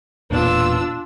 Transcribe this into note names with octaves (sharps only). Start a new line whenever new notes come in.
E1 A#2 B3 D4 F4 E6